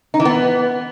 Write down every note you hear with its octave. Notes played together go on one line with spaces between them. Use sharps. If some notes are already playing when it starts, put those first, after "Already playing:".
D#4
E3
B3